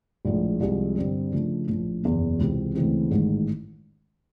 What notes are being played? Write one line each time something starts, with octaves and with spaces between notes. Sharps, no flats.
A#1 A2 F3 G#3
C2 C3 F3 G#3
G2 D3 G3 C4
C#3 F3 A3 D4
A#1 A2 F3
F#1 E2 B2
C#2 C3 E3 G#3 C4
D2 C#3 E3 G#3 C4
A1 G#2 D#3 G#3